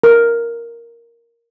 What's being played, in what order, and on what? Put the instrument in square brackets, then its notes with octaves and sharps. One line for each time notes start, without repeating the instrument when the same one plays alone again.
[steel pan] A#4